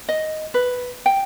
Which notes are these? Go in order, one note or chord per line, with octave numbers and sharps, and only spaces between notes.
D#5
B4
G5